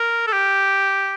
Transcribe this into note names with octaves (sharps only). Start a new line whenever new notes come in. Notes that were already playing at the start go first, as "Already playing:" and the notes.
Already playing: A#4
A4
G4